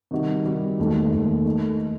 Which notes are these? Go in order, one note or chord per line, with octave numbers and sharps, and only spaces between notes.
C3 D#3 G3 D#4 F#4
C3 D#3 G3 D#4 F#4
E1 D#2 D#3 A3
E1 D#2 D#3 A3
D#3 A3 D#4